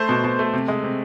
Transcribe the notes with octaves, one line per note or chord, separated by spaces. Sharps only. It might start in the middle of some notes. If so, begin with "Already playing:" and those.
Already playing: A3 C5
B2
B2
A3
C3
G#3
C3